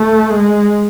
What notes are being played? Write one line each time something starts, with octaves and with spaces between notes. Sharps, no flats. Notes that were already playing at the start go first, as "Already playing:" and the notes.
Already playing: A3
G#3